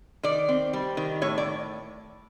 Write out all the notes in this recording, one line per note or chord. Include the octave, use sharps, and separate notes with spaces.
D#3 D5
C4
G3
D#3
A2 C#5
D5